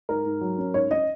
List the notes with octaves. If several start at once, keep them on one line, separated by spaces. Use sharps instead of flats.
G#2 A#4
G#2
F#3
C#4
G#2 C#5
C#4 D#5